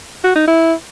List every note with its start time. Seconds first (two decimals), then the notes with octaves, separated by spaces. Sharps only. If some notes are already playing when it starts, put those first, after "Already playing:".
0.24 F#4
0.36 D#4
0.48 E4